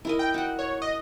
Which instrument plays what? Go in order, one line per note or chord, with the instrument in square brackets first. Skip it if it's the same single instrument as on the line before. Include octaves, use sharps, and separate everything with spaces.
[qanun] E4 A#4 D#5
[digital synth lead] G5
[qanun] F#4 F#5
[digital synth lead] C#5
D#5